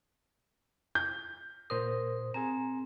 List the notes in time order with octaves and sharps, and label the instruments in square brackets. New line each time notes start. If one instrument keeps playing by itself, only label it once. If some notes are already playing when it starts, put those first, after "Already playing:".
[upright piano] G6
[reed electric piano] A#2 C5 D#6 [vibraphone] A#4
[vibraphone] C4 [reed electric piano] G#4 G#5 A#5